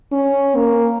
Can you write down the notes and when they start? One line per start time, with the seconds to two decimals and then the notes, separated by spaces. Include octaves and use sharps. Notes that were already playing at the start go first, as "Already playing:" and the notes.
0.12 C#4
0.56 A#3